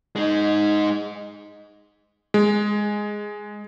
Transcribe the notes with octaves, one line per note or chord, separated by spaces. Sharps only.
G#3 D#4
G#3